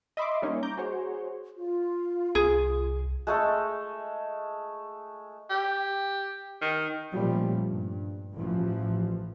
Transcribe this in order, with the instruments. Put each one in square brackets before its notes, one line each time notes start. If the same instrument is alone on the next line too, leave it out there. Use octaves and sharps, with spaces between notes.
[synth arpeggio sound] D#5 E5 B5 C6 D6
G3 A#3 C#4 D#4
A#5 D6 G6
F#4 G#4 C5 C#5
[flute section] F4
[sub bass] C2 [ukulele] G#4
[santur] G#3 A3 A4
[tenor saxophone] G4
D#3
[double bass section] A#2 F3 G3 A3 C#4
G2
A1 E3 F3